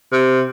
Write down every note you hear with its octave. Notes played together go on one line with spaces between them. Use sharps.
C3